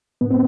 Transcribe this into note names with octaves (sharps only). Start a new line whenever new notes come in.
A2 B3
C4